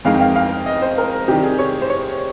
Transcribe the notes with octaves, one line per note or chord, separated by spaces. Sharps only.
F2 D#3 G#3 F5
G5
F5
F5
D#5
C5
A#4
C3 D#3 G3 G4
G#4
C#5
C5
C#5